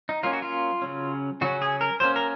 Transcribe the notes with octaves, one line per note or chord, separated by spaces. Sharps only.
D#4
F#3 A#3 C#4 F4
F#4
F4
C#3 F#3 C#4
C#3 F#3 C#4 F#4
G#4
A#4
F#3 A#3 C#4 C5
A#4